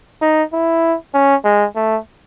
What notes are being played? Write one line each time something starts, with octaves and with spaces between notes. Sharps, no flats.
D#4
E4
C#4
G#3
A3